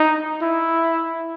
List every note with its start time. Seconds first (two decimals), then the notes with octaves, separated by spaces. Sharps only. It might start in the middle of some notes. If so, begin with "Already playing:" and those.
Already playing: D#4
0.42 E4